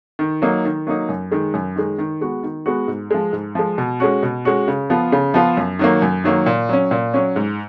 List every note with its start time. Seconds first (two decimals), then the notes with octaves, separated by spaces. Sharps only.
0.19 D#3
0.42 F#3 A#3 D#4
0.65 D#3
0.87 F#3 A#3 D#4
1.09 F#2
1.32 D#3 G#3
1.54 F#2
1.76 D#3 G#3
1.98 D#3
2.21 G#3 B3 F#4
2.43 D#3
2.66 G#3 B3 F#4
2.88 G#2
3.11 F3 G#3
3.33 G#2
3.55 F3 G#3
3.78 B2
4.00 G#3 C#4 F#4
4.23 B2
4.45 G#3 C#4 F#4
4.68 C#3
4.90 F3 B3 F4
5.12 C#3
5.34 F3 B3 F4
5.57 F#2
5.79 D#3 F#3 A#3
6.02 F#2
6.24 D#3 F#3 A#3
6.46 A#2
6.69 F#3 C#4
6.91 A#2
7.14 F#3 C#4
7.36 G#2